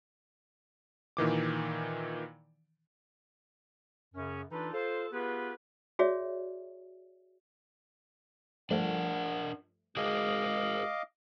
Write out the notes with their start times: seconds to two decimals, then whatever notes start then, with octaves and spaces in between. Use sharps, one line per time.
1.17 A#2 D#3 E3 D6
4.15 F#2 C#3 C#4
4.51 E3 D4 D#4 F4 A4 B4
4.73 F4 A4 C5
5.12 B3 F4 G4 G#4 B4
5.99 F#4 G#4 C#5 D5 E5
8.71 G2 F3 A3 D4 A#4 F#5
9.97 G#3 F#4 G#4 A#4 D#5 F5 D6